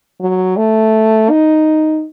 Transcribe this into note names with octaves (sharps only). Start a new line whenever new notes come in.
F#3
A3
D#4